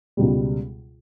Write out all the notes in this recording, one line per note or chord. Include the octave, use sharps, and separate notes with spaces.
C#2 B2 G3